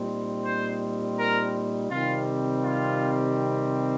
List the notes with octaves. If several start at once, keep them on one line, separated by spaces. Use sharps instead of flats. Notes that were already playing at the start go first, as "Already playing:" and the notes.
Already playing: A#2 G3 C4 D#4
C5
A#4
C3 D#3 G3 C4 F4
F4